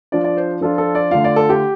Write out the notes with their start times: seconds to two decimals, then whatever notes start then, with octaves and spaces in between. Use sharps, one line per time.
0.12 F3 D4 F4 D5
0.24 D5
0.37 C5
0.61 F3 D4 F4 A4
0.78 A4
0.95 D5
1.11 D3 A3 F4 F5
1.24 D5
1.36 A4
1.50 G4